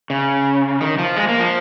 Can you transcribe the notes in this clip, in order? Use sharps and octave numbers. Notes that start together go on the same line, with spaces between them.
C#3
D#3
F3
G#3
A#3
F3